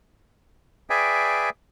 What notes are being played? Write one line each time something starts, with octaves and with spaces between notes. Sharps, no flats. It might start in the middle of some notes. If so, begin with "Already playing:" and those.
G#4 B4 D5 E5 G5 G#5